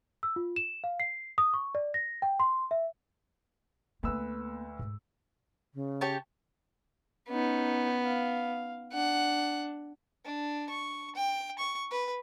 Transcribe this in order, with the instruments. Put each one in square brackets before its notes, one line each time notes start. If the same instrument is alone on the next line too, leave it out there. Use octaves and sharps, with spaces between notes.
[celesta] E6
F4
E7
F5
C7
D#6
C#6
D5
A#6
G5
C6
E5
[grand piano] D2 B4 E6 [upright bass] A#3 B3
[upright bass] G#2
[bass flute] C#3
[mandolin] G4 C#5 A5
[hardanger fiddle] B3 [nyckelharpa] C#4 D#4
[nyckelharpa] F5
[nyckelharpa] D4 [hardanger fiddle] F#5
[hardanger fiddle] D4
C#6
G5
C#6
B4